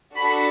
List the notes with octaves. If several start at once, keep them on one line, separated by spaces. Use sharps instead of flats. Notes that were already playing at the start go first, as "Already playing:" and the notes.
D4 F#4 A4 B5